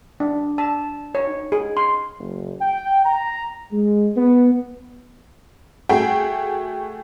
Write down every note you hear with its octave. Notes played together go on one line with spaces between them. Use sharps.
D4
A5
C#5
D#4
G#4
C6
F#1
G5
A#5
G#3
B3
A3 F#4 G#4 G5